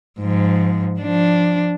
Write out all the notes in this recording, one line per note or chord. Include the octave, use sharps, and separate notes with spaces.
G#2 F3
F3 D4